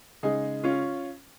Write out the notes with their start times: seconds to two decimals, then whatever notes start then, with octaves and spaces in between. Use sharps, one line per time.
0.23 C#3 G#3 D#4 G#4
0.64 C#4 F4